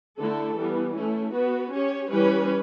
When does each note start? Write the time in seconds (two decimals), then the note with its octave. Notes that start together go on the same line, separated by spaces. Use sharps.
0.19 D3 A3 E4 A4
0.58 E3 G3 B3
0.95 A3 C#4 E4
1.34 B3 F#4 B4
1.72 C#4 G4 C#5
2.10 E3 G3 C#4 G4 B4